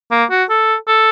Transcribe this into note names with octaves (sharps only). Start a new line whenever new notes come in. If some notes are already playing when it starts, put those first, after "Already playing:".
A#3
F#4
A4
A4